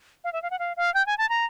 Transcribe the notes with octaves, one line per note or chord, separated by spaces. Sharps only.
F5
E5
F5
F#5
F5
F5
G5
G#5
A5
A#5